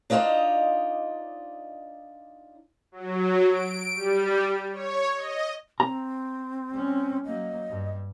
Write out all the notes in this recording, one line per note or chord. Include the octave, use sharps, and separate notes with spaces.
D4 D#4 F4 C5 D5 D#5
F#3
D7
G3
C#5
D#5
C4 A#5
G3 C#4
F#3 A#3 D#5
G2